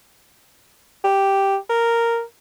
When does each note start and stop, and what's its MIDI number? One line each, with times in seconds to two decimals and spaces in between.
1.04 1.57 67
1.70 2.22 70